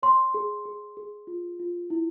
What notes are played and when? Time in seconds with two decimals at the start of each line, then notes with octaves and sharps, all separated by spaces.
0.03 C#5 C6
0.34 G#4
0.65 G#4
0.97 G#4
1.27 F4
1.60 F4
1.90 E4